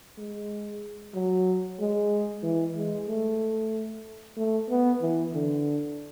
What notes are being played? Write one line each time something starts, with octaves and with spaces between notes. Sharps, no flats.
G#3
F#3
G#3
E3
G#3
A3
A3
B3
E3
D3